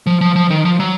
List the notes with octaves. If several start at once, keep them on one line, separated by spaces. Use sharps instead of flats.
F3
F3
F3
D#3
F3
F#3